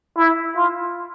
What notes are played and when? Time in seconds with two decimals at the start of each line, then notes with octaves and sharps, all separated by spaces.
0.17 E4
0.56 F4